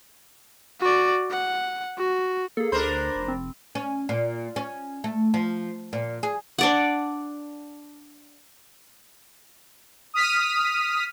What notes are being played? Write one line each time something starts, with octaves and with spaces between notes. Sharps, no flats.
F#4 D5
F#5
F#4
A#3 G#4 A4
D2 D4 A#4 C5 B5
F1
C4
C#4
A#2
C#4
A3
F3
A#2
G#4
D4 D5 F#5
D#6 F6 B6 D#7